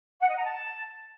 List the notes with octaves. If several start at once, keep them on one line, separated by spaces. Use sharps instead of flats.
F#5
D#5
A#5
A5